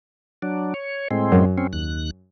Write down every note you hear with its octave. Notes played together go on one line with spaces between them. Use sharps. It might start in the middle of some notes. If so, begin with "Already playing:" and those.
F#3 D4
C#5
A2 G#3 C4
F#2
C4 C#4
D#2 F#6